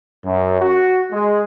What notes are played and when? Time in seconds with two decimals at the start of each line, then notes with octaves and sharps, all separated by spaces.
0.25 F#2
0.61 F#4
1.12 G#3